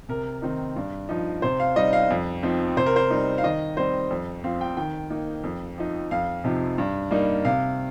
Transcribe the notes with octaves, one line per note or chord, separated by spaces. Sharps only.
C3 A#4
D#3 C4 D#4
G2
F3 D#4
C3 C5
F5
G3 D#4 D#5
F5
F2
F3 C4 D#4
C3 C5
A#4
C5
G3 C4 D#4
F5
D#3 D#5
G3 C4 C5
F2
F3 C4 F5
G5
D#3 G5
A#3 D#4
F2
F3 D#4
F2 F5
C3 F3 D#4
G2
G3 A#3 D#4
C3 F5